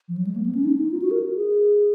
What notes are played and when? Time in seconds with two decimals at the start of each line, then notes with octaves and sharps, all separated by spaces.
0.09 F3
0.17 F#3
0.27 G#3
0.36 A#3
0.46 B3
0.55 C#4
0.65 D#4
0.78 D#4
0.91 F4
1.02 F#4
1.11 A#4
1.35 G#4